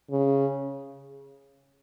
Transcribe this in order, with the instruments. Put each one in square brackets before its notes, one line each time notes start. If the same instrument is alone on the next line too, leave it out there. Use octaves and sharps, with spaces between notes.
[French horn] C#3